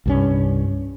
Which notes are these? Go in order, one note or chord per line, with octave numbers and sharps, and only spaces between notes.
C2 G2 C#4